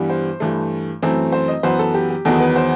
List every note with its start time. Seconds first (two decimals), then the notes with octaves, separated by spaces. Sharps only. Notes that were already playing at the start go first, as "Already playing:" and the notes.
Already playing: G2 E3 G3 B3
0.10 C5
0.40 G2 E3 A3
1.02 F#2 E3 A3 C4
1.32 C5
1.48 D#5
1.63 F#2 E3 B3 C5
1.79 A4
1.94 G4
2.10 G4
2.25 E2 D#3 F#3 B3 A4
2.40 B4
2.56 C5